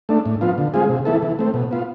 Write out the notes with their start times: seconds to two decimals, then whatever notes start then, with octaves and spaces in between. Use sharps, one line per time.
0.09 A3 D4
0.25 A2
0.41 F3 B3 F4
0.58 D3
0.74 G#3 C4 F4 G#4
0.89 C3
1.05 E3 B3 E4 A4
1.22 E3
1.39 A3 C4
1.54 B2
1.71 B3 F4